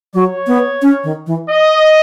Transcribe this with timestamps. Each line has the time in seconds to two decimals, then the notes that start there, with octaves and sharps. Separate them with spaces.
0.14 F#3 C#5
0.47 B3
0.82 C#4
1.04 D#3
1.27 E3
1.49 D#5